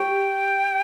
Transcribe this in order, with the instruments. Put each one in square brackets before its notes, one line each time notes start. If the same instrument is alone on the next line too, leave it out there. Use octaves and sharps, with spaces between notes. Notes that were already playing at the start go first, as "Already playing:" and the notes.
Already playing: [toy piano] G4 [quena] G5